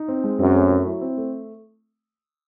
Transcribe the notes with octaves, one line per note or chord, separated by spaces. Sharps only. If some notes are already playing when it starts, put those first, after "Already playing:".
Already playing: D#4
C4
G#3
F#2 C4
A3
F#3
E4
C4
A3